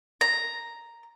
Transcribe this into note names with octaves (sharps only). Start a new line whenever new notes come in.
A#5